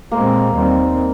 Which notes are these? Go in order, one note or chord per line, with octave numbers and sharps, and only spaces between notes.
A#2 G#3 A#3 C4
D#2 D#3 G3 C4